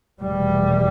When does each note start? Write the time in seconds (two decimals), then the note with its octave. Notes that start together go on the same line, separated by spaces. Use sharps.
0.21 F1 E2 B2 G3